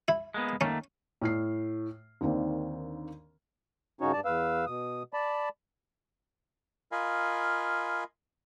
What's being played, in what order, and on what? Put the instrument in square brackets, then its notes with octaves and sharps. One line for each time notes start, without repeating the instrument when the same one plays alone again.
[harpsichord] E4
[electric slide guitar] G#3 A#3 B3
[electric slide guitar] D#3 A3 A#3 [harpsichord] C#4
[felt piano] A2 F6 C7
D#2 D3 D#3 A#3 C4 D4
[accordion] G2 C#3 C#4 D#4 F#4 C#5
G2 D5 A5
E2 B4 F5 E6
B2 D#6
D5 A5 B5
[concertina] F4 A#4 D#5 F5 G#5 B5